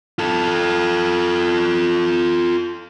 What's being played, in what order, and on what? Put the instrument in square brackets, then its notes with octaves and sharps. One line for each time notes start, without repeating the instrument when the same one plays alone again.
[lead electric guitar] F4 A4